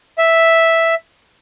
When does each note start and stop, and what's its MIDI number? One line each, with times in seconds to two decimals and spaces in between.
0.18 0.95 76